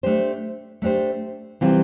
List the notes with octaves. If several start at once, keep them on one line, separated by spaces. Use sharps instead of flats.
A3 D4 G4 C5
A3 D4 G4 C5
C3 E3 G3 C4 F4